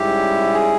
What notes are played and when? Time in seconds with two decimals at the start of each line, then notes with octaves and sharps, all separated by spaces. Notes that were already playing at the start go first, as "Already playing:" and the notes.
Already playing: G#2 G3 C#4 E4 G4
0.54 G#4